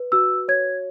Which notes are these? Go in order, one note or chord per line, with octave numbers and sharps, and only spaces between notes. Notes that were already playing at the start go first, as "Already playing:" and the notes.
Already playing: B4
F#4 E6
C#5 G#6